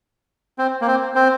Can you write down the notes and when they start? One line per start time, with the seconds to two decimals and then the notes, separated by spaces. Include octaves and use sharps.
0.59 C4
0.81 A#3
0.87 C4
1.15 C4